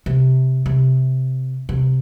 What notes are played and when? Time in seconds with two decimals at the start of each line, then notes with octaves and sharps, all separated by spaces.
0.06 C3
0.66 C3
1.69 C3